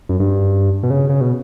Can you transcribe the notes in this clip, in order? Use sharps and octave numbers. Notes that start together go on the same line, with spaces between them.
F#2
G2
B2
C#3
C#3
B2